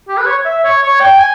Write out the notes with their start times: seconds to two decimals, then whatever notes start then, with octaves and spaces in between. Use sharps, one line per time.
0.08 G4
0.17 B4
0.27 C#5
0.45 E5
0.64 C#5
0.82 C#5
1.00 G5
1.19 G#5